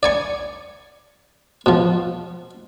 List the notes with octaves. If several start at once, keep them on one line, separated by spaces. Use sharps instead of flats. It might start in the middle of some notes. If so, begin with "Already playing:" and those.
D5 G#5 C#6
B2 F3